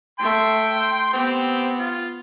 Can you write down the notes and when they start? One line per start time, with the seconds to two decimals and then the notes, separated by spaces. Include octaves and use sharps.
0.20 A3 E5 G5 C6
1.14 B3 C4 G4
1.79 F4